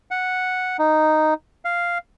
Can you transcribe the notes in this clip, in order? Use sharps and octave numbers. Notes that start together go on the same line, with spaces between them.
F#5
D#4
F5